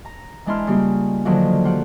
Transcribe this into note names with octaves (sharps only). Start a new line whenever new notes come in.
A#5
E3 G#3 D4 E4 C6 F6
C#3 G3 A#3 F4 G4
A#2 D3 D#3 F3 F#3 A#3
F4 G4 F#5